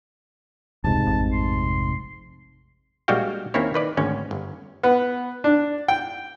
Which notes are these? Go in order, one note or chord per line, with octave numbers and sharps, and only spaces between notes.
F1 C#2 G#2 C3 A5
A1
C6
A#1 G3 G#3 F#4 F5 G5
D#2 A#3 C4 C#4 E4 C#5
D#3 B4 D5
G#1 D2 C#4
G1
B3
D4
G5